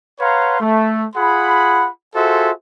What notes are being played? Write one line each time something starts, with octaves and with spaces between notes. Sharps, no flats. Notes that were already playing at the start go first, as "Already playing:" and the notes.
B4 C#5 F5 F#5 A#5 C6
A3
F4 G#4 F#5 B5
F4 F#4 G#4 A4 C5 E5